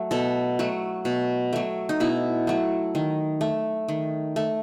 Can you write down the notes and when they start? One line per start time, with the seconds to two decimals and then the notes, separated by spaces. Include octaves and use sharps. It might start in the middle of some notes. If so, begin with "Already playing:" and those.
Already playing: F#3 A3
0.11 B2 A4
0.59 F#3 A3
1.05 B2
1.53 F#3 A3
1.89 D#4
2.00 B2 E4
2.47 F#3 A3
2.95 D#3
3.41 A3
3.88 D#3
4.36 A3